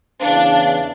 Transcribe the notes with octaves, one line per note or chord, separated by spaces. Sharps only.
E2 C#3 E3 D4 F5